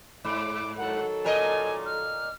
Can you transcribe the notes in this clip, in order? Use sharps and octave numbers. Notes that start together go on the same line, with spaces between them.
G#2 D6
D#3 F#3 A4 F#5
A#2 A#4 D#5 G#5
F6